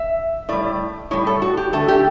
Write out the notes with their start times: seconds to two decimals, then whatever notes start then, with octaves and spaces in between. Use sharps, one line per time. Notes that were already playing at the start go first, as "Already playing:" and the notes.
Already playing: E5
0.49 A2 G3 D5
1.11 A2 G3 C#5
1.27 A4
1.42 F#4
1.57 G4
1.73 D3 A3 A4
1.88 G4